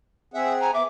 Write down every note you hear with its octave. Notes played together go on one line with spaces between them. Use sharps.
C4 G#4 E5 F#5
G#5 A#5
B3 E5 D6